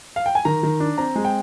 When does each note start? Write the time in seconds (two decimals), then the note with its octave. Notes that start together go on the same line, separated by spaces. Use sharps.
0.16 F5
0.26 G5
0.35 G#5
0.45 D#3 A#5
0.63 D#3
0.80 D4
0.98 C4 A#5
1.16 G#3
1.25 G5